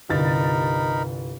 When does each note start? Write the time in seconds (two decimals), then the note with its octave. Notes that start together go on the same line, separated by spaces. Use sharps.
0.10 G1 C2 D#4 A#4 B5 A6